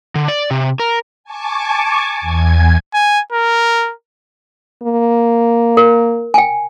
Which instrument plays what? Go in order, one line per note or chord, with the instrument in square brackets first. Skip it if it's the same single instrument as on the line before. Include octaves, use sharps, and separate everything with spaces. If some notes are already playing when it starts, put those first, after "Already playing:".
[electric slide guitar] D3
D5
C3
A#4
[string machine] G#5 A5 C#6 D6
E2 G#5 G#6
[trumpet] G#5
A#4
[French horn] A#3
[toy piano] A#4
G5 G#5